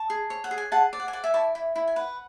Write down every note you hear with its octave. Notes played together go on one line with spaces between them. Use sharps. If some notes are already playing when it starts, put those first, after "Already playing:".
Already playing: A5 C#6
G#4
C#5
F#5
G#4
G#5
G#4 F#5 A5
D5
F#5
G#5
D5 F#5
E5 G#5
E4 A5 C#6
E4
E4
G#5
B4 F#5